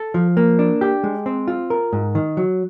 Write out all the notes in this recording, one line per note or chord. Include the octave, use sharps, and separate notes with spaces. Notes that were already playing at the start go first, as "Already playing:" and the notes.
Already playing: A4
F3
A#3
D4
G4
G#3
C4
F4
A#4
G#2
D#3
F#3